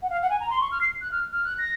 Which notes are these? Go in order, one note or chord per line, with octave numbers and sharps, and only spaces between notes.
F#5
F5
F#5
G#5
A#5
C6
C#6
F6
C7
F#6
F6
F6
F#6
A#6